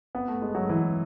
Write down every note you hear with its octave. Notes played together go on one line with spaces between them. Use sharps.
B3
A3
G#3
F#3
E3